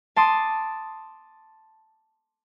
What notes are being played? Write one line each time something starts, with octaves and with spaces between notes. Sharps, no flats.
A5 C6 D6 D#6